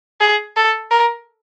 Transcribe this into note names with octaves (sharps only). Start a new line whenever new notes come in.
G#4
A4
A#4